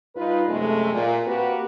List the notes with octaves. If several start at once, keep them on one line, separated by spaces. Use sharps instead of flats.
G2 D#4 F4 B4
F#2 C3 G#3 A3
A#2
A#3 C4 F#4 G4 B4